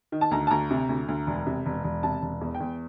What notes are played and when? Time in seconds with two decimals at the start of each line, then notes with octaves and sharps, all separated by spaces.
0.12 D#3
0.21 A5
0.31 D2 A#5
0.47 A5
0.51 D2 A#5
0.71 C3
0.89 D2
1.08 D2
1.27 E1
1.47 C3
1.66 E1
1.84 E1
2.03 C3 A5
2.22 E1
2.41 E2
2.55 G5
2.60 E2